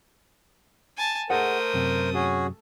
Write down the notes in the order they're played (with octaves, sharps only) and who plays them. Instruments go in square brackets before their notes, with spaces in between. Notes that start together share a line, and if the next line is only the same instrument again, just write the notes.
[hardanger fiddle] G#5 A5
[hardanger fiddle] A3 D#6 [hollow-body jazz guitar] G#4 D#5 F#5 [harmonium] A#4 C5
[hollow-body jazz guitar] F#2 C3
[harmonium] C#4 F#4 G#4